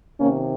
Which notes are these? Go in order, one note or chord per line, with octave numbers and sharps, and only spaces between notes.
C3 D#3 A#3 C#4